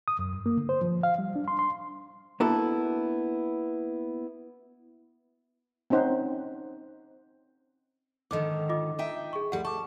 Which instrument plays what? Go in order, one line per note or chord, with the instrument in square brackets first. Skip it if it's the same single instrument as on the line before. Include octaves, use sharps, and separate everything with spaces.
[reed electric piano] D#6
F#2
G2
A#3
D3
C5
F3
F5
G3
D4
C6
C6
[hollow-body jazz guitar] A#3 B3 D4 E4 F#4 A4
[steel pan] C4 C#4 D#4 C5 F#5
[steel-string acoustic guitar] G#2 D3 D#3 [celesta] D#5 D6
[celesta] F4 D#5 D6
[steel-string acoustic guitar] D#4 E5 G5
[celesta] G#4 C#6
[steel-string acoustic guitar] D2 G3 [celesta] F#5
[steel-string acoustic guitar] A5 [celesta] C#6 D6